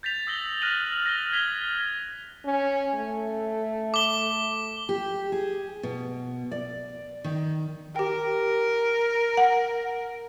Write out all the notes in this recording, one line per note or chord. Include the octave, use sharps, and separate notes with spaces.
G6 A6 B6 F7
D#6 E6 A#6 F#7 G7
F6 F#6 A#6 D#7 F7 F#7
A#6 G7
G#6 B6 F7 G7
C#4
A3
D6 G7
G4
G#4
B2
D5
D#3
G4 A#4 G5
F#5